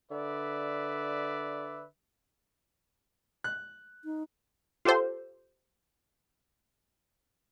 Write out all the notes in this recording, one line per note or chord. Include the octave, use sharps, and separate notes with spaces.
D3 B4 D5 E5
F#6
D#4
F4 G4 A4 C5